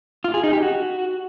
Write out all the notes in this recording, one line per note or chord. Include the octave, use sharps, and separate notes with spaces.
F4
G#4
D#4
G4
F#4